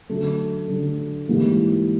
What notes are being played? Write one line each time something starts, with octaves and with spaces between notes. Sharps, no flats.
D3 F#3 A3
D3 F#3 A3
G#2 E3 G3 A#3